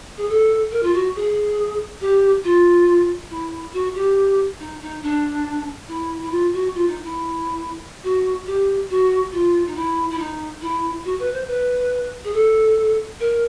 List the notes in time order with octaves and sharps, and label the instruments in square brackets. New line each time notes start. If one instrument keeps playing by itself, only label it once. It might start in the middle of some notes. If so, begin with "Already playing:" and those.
[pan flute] G#4
A4
A#4
F4
F#4
G#4
G4
F4
E4
F#4
G4
D#4
D#4
D4
E4
E4
F4
F#4
F4
D#4
E4
F#4
G4
F#4
F4
D#4
E4
E4
D#4
E4
F#4
B4
C5
B4
G#4
A4
A#4